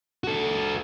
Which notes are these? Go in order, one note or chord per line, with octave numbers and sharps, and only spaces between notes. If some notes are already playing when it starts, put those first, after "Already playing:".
F#4 A4